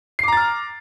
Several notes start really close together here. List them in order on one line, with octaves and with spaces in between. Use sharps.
C7 D6 A#5 A6 F6